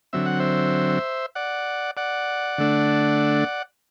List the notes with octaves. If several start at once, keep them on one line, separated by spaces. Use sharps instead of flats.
D3 F#3 C4 E5
F#5
C5 E5
D5 F#5
D5 F#5
D3 A3 D4